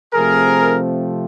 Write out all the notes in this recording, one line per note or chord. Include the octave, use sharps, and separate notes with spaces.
C3 F3 A3 C4 G#4 A#4